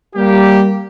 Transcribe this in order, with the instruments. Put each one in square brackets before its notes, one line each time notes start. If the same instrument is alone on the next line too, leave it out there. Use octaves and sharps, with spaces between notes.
[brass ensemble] G3 A#3 G4